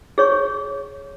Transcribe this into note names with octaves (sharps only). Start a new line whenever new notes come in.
G#4 C#5 C#6